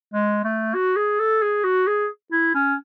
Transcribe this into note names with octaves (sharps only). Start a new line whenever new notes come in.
G#3
A3
F#4
G#4
A4
G#4
F#4
G#4
E4
C#4